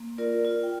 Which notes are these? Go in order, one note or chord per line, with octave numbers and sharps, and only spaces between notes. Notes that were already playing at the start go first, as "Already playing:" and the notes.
Already playing: A#3
F4 A#4 D5
F4
G5